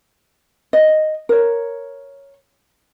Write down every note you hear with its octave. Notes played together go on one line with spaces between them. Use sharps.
D#5
A#4 C#5